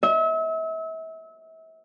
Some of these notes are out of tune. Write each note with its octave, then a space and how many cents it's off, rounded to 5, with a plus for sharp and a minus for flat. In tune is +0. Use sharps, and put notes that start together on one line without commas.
E5 -35